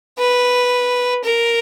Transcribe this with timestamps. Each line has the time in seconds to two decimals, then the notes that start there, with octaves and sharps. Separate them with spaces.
0.18 B4
1.24 A#4